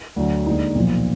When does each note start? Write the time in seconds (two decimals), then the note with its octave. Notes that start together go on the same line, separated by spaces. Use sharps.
0.16 D2 D3 F#3
0.47 D#2 D3 G#3 D#4
0.75 B1 A#2 F3